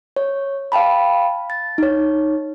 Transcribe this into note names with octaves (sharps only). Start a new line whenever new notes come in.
C#5
F5 G5 A5 B5
A6
D#4 C#5